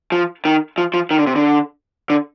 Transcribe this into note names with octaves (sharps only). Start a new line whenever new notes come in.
F3
D#3
F3
F3
D#3
D3
C3
D3
D3